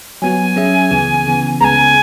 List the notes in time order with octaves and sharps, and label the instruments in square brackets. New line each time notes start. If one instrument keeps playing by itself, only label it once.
[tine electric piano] F#3 B3 F#4 [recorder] G#5
[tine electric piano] F#3 C#4 G#4 E5
C#2 C#3 E3 B3 G#4
C#3 E3 B3
[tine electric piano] C#2 C#3 G#3 B3 G#4 [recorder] G#5 A#5